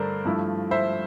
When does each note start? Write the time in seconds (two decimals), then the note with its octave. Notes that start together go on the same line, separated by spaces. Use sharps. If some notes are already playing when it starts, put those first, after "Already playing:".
Already playing: G2 D3 A3 D4 A#4 C5 D5
0.25 G2 F3 A3 E4
0.71 C5 E5